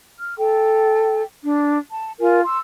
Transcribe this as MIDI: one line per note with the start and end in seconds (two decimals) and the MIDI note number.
0.17 0.35 89
0.38 1.22 69
0.38 1.22 79
1.44 1.78 62
1.90 2.11 81
2.19 2.40 65
2.19 2.40 70
2.19 2.40 80
2.45 2.59 84
2.45 2.59 88